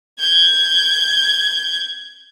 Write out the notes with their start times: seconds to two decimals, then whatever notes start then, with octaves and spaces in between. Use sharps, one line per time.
0.20 G6 G#6